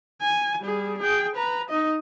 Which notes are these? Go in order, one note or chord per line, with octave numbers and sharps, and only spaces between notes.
G#5
G3 G#4
G#4 G5
B4 A#5
D#4 D#5